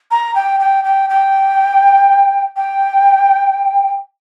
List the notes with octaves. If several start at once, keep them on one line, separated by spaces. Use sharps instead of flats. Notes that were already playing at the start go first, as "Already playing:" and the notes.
A#5
G5
G5
G5
G5
G5